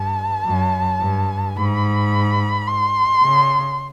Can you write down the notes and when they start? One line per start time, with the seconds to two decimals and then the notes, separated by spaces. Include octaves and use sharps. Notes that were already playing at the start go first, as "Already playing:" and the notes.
Already playing: G2 A5
0.47 F#2
1.01 G2
1.57 G#2 B5
2.67 C6
3.23 C#3